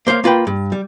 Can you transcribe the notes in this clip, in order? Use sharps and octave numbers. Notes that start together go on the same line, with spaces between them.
A#3 C5 C#5 F5
A#3 F4 B4 G5
G2
G3